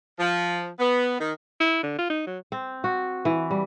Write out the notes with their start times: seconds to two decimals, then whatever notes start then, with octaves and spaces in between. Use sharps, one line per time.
0.19 F3
0.79 B3
1.20 D#3
1.60 E4
1.83 D3
1.98 F4
2.10 D#4
2.27 F#3
2.52 C4
2.84 F#4
3.25 E3
3.51 G3